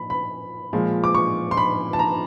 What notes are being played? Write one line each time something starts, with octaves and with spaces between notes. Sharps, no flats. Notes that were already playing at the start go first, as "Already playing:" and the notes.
Already playing: A#2 F3 B5
B5
A#2 F3 G#3
D6
C#6
C6
B5
A5
A#5